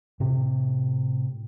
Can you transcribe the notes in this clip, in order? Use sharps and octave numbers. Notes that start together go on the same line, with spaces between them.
A2 C3